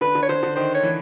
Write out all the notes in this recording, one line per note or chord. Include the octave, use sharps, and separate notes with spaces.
D3 B4
D3
C#5
D3 C5
D3
D#3 C5
C#5
E3